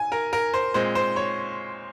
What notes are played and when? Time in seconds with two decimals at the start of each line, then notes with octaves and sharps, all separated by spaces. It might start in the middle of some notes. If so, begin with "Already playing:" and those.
Already playing: G#5
0.12 A#4
0.33 A#4
0.54 C5
0.74 A#2 G#3 C4 C5
0.95 C5
1.16 C#5